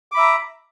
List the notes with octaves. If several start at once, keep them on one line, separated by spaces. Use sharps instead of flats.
E5 A#5 B5 D6